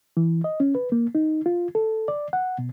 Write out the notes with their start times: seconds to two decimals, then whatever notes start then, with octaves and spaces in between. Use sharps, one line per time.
0.17 E3
0.44 D#5
0.60 C#4
0.75 B4
0.92 A#3
1.15 D#4
1.46 F4
1.75 A4
2.08 D5
2.33 F#5
2.59 B2